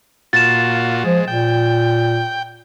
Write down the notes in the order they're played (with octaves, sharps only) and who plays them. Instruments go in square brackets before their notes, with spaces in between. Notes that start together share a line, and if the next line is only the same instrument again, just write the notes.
[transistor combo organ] A#2 F4 F#4 [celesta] A6 E7
[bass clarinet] F3 [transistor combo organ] G#3
[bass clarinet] A#2 [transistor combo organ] G5